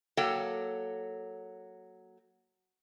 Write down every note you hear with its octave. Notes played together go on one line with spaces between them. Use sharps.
F#3 A#3 A4 G5